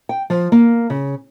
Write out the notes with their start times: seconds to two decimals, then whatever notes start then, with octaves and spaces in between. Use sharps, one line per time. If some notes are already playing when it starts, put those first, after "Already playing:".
0.09 G5
0.30 F3
0.52 A#3
0.90 C#3